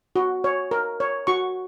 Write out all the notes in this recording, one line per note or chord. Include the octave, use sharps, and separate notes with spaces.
F#4
C#5
A#4
C#5
F#4 C#6